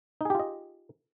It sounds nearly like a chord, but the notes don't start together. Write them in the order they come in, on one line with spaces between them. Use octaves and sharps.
D#4 G#4 G4 F4 D#5